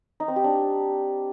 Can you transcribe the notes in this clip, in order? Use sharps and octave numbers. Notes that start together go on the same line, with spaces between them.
D#4
C4
G4
D4